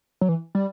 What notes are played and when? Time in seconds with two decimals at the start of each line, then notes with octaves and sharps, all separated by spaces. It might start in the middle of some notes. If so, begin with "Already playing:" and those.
0.21 F#3
0.29 E3
0.55 G3